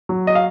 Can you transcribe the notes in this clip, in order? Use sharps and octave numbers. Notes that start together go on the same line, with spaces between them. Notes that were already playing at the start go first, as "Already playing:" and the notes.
F#3
D#5
F5